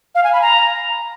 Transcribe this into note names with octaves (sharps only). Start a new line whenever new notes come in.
F5
G#5
B5
A#5